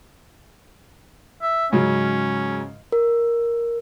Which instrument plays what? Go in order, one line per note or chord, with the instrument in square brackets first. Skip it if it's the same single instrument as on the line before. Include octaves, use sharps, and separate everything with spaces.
[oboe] E5
[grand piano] G#2 C#3 F#3 [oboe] C#4
[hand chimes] A#4